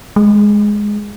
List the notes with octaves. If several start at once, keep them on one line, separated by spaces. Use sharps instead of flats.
G#3